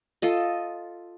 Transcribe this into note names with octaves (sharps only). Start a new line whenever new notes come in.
F4 A4 D#5